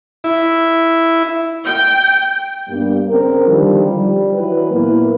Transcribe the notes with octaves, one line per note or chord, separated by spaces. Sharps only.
E4
G5
G2 G3 A#3 B3 D4
C#3 C4 A#4
D3 D#3 F3 G3
G3
E3 F#3 B4
A#2 A#3 B3 E4 B4